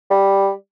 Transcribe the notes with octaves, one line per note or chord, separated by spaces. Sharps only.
G3